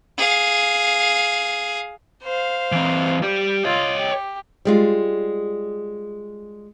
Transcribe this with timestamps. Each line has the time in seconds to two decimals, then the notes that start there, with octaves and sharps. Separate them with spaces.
0.18 G#4 F5
2.23 C5 F5
2.72 E3 C4
3.23 G4 D5
3.65 F4 C#5 D#5
3.99 G4
4.65 G3 G#3 F4